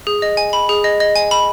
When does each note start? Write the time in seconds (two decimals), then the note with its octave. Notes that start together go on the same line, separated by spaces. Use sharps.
0.07 G#4
0.22 D#5
0.37 G#5
0.53 B5
0.69 G#4
0.84 D#5
1.00 D#5
1.16 G#5
1.31 B5